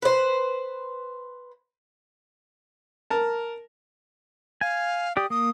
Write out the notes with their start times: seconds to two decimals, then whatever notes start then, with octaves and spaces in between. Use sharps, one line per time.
0.02 B4 C5
3.10 A#4 A5
4.61 F5 G#5
5.17 G4 D5 D#6
5.30 A#3 D#6